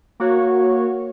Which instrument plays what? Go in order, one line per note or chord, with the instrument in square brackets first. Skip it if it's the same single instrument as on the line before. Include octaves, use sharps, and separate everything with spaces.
[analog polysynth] A#3 F#4 C#5